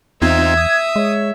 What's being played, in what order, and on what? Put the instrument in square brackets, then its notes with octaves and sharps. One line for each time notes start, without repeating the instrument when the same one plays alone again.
[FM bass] E2 [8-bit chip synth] C4 D#4 F4 [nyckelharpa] E5 [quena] G#6
[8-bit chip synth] D#6
[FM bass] G#3 [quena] C#5